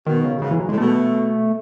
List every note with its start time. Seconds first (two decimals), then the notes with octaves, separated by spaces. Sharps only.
0.07 B2 D#3
0.24 C#3
0.42 G#2 C#3
0.51 E3
0.60 F#3
0.69 A2 G#3
0.78 B2 A3